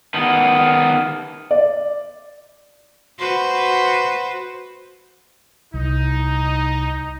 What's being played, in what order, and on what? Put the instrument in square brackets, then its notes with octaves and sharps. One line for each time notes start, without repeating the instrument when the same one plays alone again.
[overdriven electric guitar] D#3 B3
[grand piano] D5
[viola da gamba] F#4 B4 C5
[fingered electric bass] C2 [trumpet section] D#4